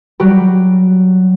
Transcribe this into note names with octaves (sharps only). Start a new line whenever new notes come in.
F#3 G3 F#4 G4